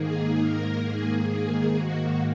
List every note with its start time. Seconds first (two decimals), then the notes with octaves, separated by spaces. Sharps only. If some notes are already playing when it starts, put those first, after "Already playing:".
Already playing: G#2 D#3 A#3 G#4
0.38 A#4
0.83 G#4
1.28 G#4
1.73 F#4